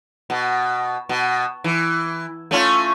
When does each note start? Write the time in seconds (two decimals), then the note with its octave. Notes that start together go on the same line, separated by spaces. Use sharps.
0.30 B2
1.09 B2
1.64 E3
2.51 A3 C#4 F4